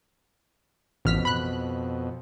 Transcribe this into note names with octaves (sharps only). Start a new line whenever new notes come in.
A1 F2 B2 F6 B6
B5 F#6